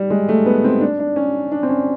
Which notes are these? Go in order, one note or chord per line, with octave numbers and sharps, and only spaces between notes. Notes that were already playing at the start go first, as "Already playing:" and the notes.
Already playing: G3
G#3
A3
B3
C4
D4
D4
C#4
D4
C4
C#4